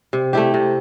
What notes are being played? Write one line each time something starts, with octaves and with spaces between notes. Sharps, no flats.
C3
A3 E4 G4
C3